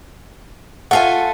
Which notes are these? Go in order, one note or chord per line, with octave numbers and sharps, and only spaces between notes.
A3 F4 F#5 G#5